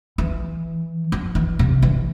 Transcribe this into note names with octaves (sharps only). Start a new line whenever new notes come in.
E3
F3
E3
C3
E3